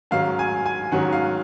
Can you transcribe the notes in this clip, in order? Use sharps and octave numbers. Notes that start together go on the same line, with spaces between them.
G#2 D#3 F#3 C#4 F5
G#5
G#5
G#2 D#3 F#3 C#4 F#5
F5